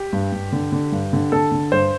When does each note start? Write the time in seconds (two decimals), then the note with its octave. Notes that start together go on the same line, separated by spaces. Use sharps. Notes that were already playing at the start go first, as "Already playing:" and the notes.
Already playing: G4
0.13 G2
0.32 G2
0.52 D3
0.72 D3
0.92 G2
1.13 D3
1.32 D3 A4
1.52 D3
1.72 G2 C5